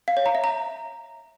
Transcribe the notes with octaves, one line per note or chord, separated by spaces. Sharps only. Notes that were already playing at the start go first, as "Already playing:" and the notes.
F5
C#5
A#5
E5
A#5